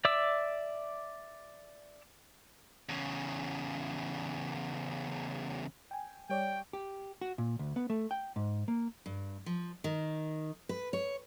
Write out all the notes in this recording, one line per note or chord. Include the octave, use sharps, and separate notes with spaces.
D5 E5 D6 E6
E2 C#3
G5 G#5
G3 C#5 D5 G5
G4
F#4
A#2
D2
B3
A3
G5
G#2
A#3
G2
F3
D#3
B4
C#5